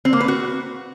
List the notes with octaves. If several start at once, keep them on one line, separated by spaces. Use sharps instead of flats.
C4
A#3
B4
F#4